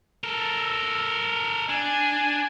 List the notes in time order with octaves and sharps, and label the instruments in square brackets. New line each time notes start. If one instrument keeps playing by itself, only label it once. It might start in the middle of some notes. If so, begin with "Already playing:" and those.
[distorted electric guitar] A4 A#4
[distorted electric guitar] D4 [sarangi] G#5